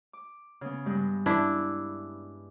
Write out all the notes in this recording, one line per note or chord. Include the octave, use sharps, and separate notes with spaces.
D6
C#3 B3
G2 G#3
D4 E4